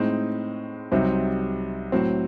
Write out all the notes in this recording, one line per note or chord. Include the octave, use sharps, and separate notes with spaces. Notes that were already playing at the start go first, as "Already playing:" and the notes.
Already playing: A2 G#3 C4 D#4
C2 C3 F#3 C4 D#4
A2 F#3 C4